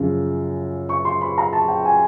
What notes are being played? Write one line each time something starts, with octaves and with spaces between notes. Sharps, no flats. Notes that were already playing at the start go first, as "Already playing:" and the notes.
Already playing: F#2 C#3 F3
C#6
C6
B5
A#5
A5
G5
G#5